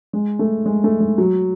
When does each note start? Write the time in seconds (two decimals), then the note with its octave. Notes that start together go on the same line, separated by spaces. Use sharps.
0.13 G#3
0.39 A3
0.66 G#3
0.84 A3
1.00 G#3
1.18 F#3